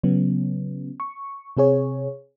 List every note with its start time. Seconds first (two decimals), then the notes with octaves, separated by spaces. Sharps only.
0.03 C#3 F#3 B3 C#4
1.00 C#6
1.57 C3 C4 G#4 C#5